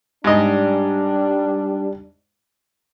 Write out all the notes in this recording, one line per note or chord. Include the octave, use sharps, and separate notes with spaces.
G#2 G3 D4 D#5